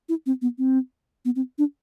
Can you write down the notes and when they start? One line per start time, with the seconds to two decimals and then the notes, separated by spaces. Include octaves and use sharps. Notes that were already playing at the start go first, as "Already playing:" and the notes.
0.09 E4
0.26 C4
0.42 B3
0.58 C4
1.25 B3
1.36 C4
1.58 D4